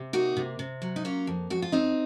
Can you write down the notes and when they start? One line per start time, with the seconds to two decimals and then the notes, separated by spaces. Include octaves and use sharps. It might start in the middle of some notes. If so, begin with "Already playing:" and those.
Already playing: C3
0.13 A#3 D#4 F#4
0.37 C3
0.59 C3
0.82 F#3
0.96 D#4
1.05 A#3 C#4 F4
1.27 F2
1.50 F2 F#4
1.62 F4
1.72 F2 C4 D#4